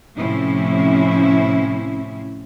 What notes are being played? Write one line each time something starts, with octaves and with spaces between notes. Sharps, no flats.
A2 C3 F3 C4 C#4 E4